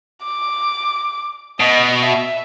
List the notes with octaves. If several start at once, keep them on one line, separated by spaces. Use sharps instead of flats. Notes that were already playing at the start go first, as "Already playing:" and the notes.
D6
B2 D#5
E5